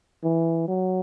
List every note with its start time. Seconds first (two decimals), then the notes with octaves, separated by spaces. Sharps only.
0.24 E3
0.68 F#3